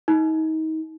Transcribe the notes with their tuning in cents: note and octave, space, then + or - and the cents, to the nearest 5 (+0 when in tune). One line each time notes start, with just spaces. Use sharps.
D#4 +30